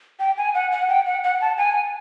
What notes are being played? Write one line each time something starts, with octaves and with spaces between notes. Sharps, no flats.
G5
G#5
F#5
F#5
G5
F#5
F#5
A5
G#5